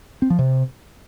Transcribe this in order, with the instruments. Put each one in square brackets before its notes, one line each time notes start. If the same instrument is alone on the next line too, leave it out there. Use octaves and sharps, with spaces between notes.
[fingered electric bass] C4
F3
C3